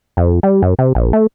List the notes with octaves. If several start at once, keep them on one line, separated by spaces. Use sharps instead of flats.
F2
G3
F#2
C3
A#1
A3